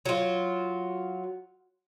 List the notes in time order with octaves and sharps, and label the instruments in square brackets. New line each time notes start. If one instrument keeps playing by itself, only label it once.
[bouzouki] F#3 F4